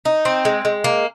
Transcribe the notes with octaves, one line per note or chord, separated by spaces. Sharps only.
D#4
C4
G#3
G#3
A#3